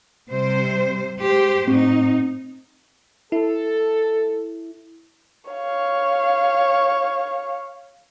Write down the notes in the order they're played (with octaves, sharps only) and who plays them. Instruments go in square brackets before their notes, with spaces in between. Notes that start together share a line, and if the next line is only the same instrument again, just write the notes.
[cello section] C3 G3 C5
G#3 G4 C5
[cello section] A2 D#4 [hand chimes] C4
[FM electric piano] E4 [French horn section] A4
[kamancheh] C#5 F5